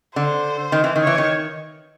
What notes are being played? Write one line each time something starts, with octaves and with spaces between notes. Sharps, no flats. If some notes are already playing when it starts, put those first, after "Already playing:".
D3 C5
D#3
E3
D#3
C#5
E3
D#3